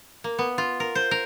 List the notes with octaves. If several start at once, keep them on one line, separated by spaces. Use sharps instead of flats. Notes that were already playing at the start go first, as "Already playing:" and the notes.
A#3
B3
F4
A#4
C5
A#4